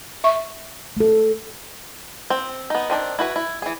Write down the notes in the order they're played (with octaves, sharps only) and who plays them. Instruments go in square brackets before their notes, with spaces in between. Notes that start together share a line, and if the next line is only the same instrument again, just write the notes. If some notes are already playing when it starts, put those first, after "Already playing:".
[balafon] E5 C#6
[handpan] A3 A4
[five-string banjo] C4
B3 D#4
D#3 C4 D4
E4 F#4 B4
E4
E3 G#4